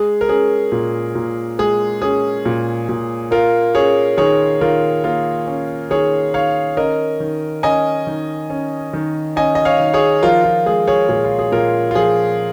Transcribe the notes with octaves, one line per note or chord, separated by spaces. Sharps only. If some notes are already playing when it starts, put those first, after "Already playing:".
Already playing: G#3 G#4
A#4
C#4 G#4
A#2
A#2
G#3 G#4
C#4 G#4
A#2
A#2
A#3 F4 A#4
C#4 G#4 C#5
D#3 G#4 C#5
D#3 F4 A#4
A#3 F4 A#4
C#4
D#3 G#4 C#5
D#3 C#5 F5
C#4 A#4 D#5
D#3
C#4 D#5 G#5
D#3
C#4
D#3
C#4 D#5 G#5
D#5
C#5 F5
D#3
G#4 C#5
F3 F4 A#4
F4
G#3 G#4
G#4 C#5
A#2 G#4
F4
G#4
A#2 F4 A#4
F4
F3 G#4